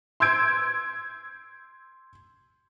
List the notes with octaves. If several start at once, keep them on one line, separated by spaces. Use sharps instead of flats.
C6 E6 G6 G#6 D7